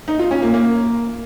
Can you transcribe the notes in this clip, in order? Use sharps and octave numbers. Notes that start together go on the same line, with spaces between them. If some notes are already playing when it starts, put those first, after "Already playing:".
D#4
F4
C#4
A#3
A#3